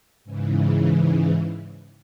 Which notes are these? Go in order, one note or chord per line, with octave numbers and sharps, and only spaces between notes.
G#2 C#3 E3